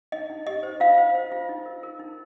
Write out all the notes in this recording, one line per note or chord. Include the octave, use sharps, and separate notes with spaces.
D#4 D#5
D#4
G4 D#5
C5
F4 F5
C5
C5
F4
D#4
A#4
A#4
D#4